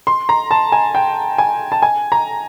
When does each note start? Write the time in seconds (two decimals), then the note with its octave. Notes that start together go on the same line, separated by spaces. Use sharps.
0.07 C6
0.29 A#5
0.51 A5
0.72 G#5
0.95 G5
1.38 G#5
1.72 A5
1.82 G#5
2.12 A#5